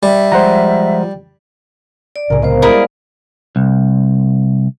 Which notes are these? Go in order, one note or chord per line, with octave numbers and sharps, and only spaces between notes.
G3 E5
F3 G#3 C5 F#5 A#5
D5
C2 A2 C#3 G#4 A#4
G#3 B3 C5 F5
G3 G#3 E4 G#4 A#4 D5
C2